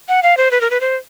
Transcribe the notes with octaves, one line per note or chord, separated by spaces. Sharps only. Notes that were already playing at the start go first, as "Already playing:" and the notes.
F#5
F5
C5
B4
A#4
B4
C5